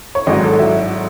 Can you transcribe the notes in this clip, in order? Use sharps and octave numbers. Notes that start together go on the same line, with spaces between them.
C#5
G#1 G#2 F#3 D#5
A4
F#3 E5